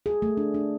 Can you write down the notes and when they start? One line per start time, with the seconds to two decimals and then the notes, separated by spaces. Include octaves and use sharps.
0.06 G#4
0.22 A3
0.37 D4
0.54 D4